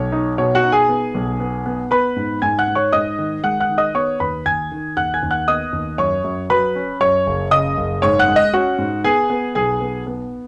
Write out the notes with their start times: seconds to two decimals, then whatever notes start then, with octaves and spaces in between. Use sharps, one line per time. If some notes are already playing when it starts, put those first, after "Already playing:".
Already playing: B1 C#5
0.12 D#4
0.38 B2 C#5
0.55 F#4 F#5
0.64 D#4
0.72 G#4 G#5
0.89 B3
1.15 B1
1.40 B3
1.66 B3
1.91 B3 B4 B5
2.16 G#2
2.42 G#2 G#5 G#6
2.59 F#5 F#6
2.68 G#2
2.75 C#5 C#6
2.93 G#2 D#5 D#6
3.19 D#3
3.44 G#3 F#5 F#6
3.60 F#5 F#6
3.69 D#3
3.78 D#5 D#6
3.94 B3 C#5 C#6
4.20 D#2 B4 B5
4.46 D#2 G#5 G#6
4.72 D#3
4.97 D#2 F#5 F#6
5.14 G#5 G#6
5.23 D#2
5.31 F#5 F#6
5.48 B3 D#5 D#6
5.73 D#2
5.98 F#2 C#5 C#6
6.24 F#2
6.50 F#3 B4 B5
6.75 C#4
7.01 F#2 C#5 C#6
7.27 F#1
7.51 C#3 D#5 D#6
7.77 F#1
8.02 G#2 C#5 C#6
8.19 F#5 F#6
8.28 G#3
8.36 D#5
8.53 C#4 F#4 F#5
8.78 G#2
9.04 B3 G#4 G#5
9.30 B3
9.55 B1 G#4 G#5
9.81 B3
10.07 B3